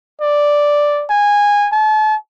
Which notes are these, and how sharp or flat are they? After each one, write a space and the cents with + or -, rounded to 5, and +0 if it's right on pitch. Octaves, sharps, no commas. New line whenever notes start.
D5 +0
G#5 -15
A5 -35